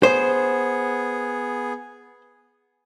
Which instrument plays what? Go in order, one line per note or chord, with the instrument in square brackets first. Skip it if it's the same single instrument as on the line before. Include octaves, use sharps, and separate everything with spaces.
[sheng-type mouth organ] B3 G#4 [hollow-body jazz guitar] C5